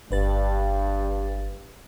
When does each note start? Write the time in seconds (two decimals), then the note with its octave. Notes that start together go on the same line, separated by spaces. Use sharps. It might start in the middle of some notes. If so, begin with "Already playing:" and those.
0.11 G1 G2 B4 A6